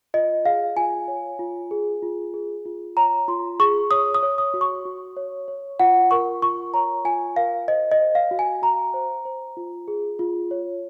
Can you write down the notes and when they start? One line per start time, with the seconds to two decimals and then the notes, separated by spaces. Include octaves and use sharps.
0.14 F4 D#5
0.45 G#4 F5
0.76 F4 G#5
1.08 C#5
1.39 F4
1.71 G#4
2.02 F4
2.34 G#4
2.66 F4
2.97 C#5 A#5
3.28 F4 C6
3.60 G#4 C#6
3.91 C#5 D#6
4.14 D#6
4.23 C#5
4.38 D#6
4.54 F#4
4.61 C#6
4.85 F#4
5.17 C#5
5.48 C#5
5.80 F4 F#5
6.11 A#4 C#6
6.42 F4 C#6
6.74 C#5 A#5
7.05 F4 G#5
7.36 A#4 F5
7.68 C5 D#5
7.91 D#5
8.00 C5
8.15 F5
8.31 F#4
8.39 G#5
8.62 F#4 A#5
8.94 C5
9.25 C5
9.57 F4
9.88 G#4
10.19 F4
10.51 C#5